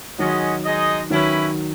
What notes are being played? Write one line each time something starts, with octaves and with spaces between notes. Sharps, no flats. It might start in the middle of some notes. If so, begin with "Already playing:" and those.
D#3 F#3 G#3 C#4 G#4 D#5 F#5
G#3 D#4 G#4 D#5
D#3 F#3 C#4 E4 B4